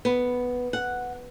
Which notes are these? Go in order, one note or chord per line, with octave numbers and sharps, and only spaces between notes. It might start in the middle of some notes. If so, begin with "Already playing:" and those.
B3
F#5